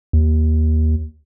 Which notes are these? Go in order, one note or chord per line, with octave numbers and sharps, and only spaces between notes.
D#2